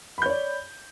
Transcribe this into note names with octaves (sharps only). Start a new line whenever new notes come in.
C#5 D5 B5 G6